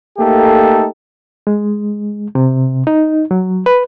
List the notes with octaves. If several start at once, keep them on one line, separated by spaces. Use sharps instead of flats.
A3 A#3 D#4 G4 A4
G#3
C3
D#4
F#3
B4